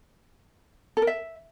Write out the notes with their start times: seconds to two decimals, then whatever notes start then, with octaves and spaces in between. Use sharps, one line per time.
0.97 A4
1.02 A#4
1.07 E5